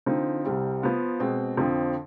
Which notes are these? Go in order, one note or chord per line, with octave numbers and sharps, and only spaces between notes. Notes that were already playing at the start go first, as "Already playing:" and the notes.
D3 F3 C4 D#4
C2 C3 G3 C4
F3 B3 F4
B2 G#3 C4
F2 D3 F3 C4